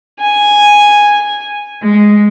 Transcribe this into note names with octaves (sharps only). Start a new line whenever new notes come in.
G#5
G#3